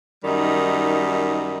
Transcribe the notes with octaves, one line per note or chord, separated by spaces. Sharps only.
F#2 D#3 G3 D#4